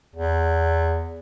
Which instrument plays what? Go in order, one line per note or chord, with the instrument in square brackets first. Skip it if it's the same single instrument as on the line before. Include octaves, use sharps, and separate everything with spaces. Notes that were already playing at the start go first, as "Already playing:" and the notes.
[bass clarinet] E2